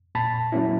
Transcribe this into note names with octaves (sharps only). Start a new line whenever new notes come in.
A#2 A5 B5
F#3 A#3 C#4 E4